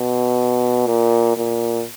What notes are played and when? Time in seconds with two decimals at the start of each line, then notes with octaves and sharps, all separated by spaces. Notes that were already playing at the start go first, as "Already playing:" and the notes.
Already playing: B2
0.86 A#2
1.37 A#2